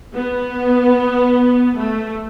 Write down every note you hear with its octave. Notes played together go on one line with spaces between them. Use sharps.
B3
A3